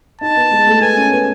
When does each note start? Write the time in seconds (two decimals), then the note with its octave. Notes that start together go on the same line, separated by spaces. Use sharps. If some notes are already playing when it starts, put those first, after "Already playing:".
0.21 D#4 A5
0.36 B3
0.51 G#3
0.67 A3
0.81 B3 G#5
0.97 C#4
1.12 B3